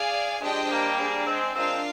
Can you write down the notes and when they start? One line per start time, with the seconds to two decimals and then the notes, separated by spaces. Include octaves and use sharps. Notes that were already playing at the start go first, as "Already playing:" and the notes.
Already playing: G#4 D5 F5 G#5
0.41 F3 G#3 D4 G4 C5 D#5 G5
0.70 G3 A#3
0.98 D4 G#4 D5
1.26 G#3 C4
1.55 G#3 C4 D4 F4 A#4 F5